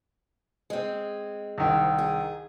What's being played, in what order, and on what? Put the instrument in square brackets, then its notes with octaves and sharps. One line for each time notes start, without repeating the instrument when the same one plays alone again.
[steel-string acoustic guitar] G#3 C4
[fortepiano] C2 D#3
[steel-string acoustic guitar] G#4